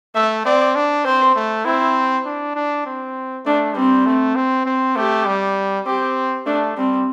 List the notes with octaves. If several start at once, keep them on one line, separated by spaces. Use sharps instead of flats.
A3 E5
C4 D5
D4
C4 C5
A3
C4 E4
D4
D4
C4
A3 D4
G3 C4
A3
C4
C4
A3 G4
G3
C4 G4
A3 D4
G3 C4